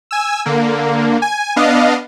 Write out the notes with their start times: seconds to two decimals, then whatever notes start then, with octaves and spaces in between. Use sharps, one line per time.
0.11 G#5 E6
0.46 D3 A#3
1.22 G#5
1.56 B3 D4 D#5 F5